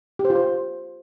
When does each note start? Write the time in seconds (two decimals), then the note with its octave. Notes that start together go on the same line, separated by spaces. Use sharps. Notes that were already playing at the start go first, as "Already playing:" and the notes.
0.19 G4
0.25 C5
0.30 F4
0.35 C5